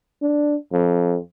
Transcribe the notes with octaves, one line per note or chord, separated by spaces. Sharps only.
D4
F2